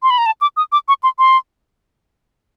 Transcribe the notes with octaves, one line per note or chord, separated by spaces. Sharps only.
C6
B5
A#5
A5
D6
D#6
D6
C#6
C6
C6